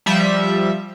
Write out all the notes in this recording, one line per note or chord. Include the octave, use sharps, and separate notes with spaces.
F3 G3 E5